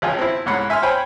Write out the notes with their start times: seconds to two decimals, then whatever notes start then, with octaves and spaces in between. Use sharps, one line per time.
0.02 G#1 C#2 F4 G5 G#5
0.19 C4 E4
0.46 C2 G#2 C#5 F#5 B5
0.70 E5 G#5 C6 F6
0.82 C5 C#5 G5 G#5 B5